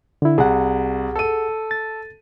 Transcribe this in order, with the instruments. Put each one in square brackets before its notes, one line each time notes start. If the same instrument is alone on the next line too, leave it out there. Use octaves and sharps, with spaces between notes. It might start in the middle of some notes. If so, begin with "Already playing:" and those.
[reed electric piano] D3 E4
[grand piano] C2 [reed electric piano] G#4 F#5
[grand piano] A4 D#7
[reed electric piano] A6